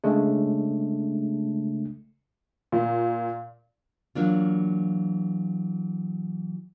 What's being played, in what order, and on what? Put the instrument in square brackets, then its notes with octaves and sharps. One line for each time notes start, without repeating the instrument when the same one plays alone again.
[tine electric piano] C#3 G#3 A3 D4
[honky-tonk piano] A#2
[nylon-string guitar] E3 F#3 A#3 D4 F4